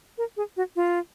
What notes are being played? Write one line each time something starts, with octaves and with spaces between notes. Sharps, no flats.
A#4
G#4
F#4
F4